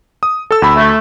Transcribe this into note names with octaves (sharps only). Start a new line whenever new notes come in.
D#6
A4 E6
D2 B5
A3